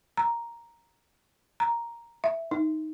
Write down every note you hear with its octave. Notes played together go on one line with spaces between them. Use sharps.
A#5
A#5
E5
D#4